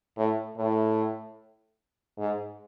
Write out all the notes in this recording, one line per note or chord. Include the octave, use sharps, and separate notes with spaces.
A2
A2
G#2